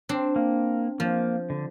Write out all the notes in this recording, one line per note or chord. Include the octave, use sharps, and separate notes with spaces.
C4 D4
A#3
F3 A#3
D3